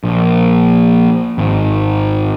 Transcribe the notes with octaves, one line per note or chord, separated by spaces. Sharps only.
A#1
G#1